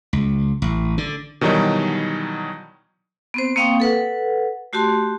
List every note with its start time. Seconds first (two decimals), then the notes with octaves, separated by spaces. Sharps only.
0.13 C#2
0.62 A1
0.98 D3
1.41 B2 D#3 E3 F#3 G3 D#4
3.34 B3 C4 C5
3.56 A#3 C4 F5 G5 C#6 D#6
3.80 A4 B4 F#5
4.73 A3 F#4 G4 A5 C6